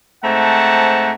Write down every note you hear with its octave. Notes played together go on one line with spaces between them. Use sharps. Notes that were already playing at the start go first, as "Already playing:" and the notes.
G#2 A3 C4 F#5 A5 A#5